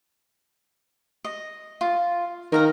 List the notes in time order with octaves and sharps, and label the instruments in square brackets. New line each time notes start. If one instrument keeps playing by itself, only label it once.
[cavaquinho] D#5
F4
[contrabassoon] D#3 [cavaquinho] A#4 F5 A#5